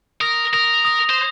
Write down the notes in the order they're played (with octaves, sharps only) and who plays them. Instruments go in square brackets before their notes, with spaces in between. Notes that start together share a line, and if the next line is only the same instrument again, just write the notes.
[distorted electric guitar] A#4 [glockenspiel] D#6 A#6 F7
[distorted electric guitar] A#4 [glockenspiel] D#6 A#6 F7
[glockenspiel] D#6 A#6 F7
[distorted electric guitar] C5